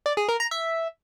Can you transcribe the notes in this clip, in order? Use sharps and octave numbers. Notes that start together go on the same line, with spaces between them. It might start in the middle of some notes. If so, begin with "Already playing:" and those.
D5
G#4
A#4
A#5
E5